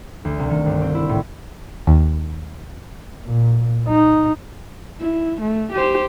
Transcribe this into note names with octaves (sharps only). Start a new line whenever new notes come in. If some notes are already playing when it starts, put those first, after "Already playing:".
D2
C2
D#3
G1
C4
E4
A2
D#2
A#2
D#4
E4
A3
G4 C5